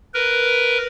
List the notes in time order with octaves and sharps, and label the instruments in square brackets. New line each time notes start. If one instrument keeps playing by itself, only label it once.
[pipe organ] A#4 B4